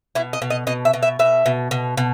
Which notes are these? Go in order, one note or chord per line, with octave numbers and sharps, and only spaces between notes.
B2 E4
D#5
B2
D#5
B2 D#5
E5
B2
E5
B2 E5
B2
B2
B2